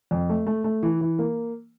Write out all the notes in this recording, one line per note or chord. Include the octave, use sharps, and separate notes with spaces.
F2
A3
A3
A3
E3
E3
A#3